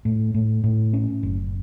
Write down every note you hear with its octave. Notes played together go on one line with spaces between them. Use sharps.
A2
A2
A2
C#4
F#1